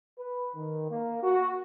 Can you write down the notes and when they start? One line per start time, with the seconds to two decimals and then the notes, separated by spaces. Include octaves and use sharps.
0.18 B4
0.55 D#3
0.90 A#3
1.23 F#4